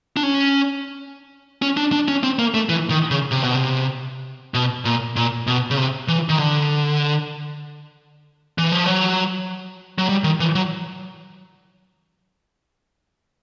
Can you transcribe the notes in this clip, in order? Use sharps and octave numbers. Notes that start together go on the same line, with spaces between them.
D4
C#4
C#4
D4
D4
C#4
C4
A#3
A3
E3
D#3
C#3
C3
B2
C3
B2
A#2
A#2
B2
C#3
C3
E3
D#3
D3
E3
F3
F#3
F#3
G3
D#3
E3
F#3